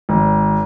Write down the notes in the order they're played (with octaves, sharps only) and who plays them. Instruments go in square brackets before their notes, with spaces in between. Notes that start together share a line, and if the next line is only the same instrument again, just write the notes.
[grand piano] G#1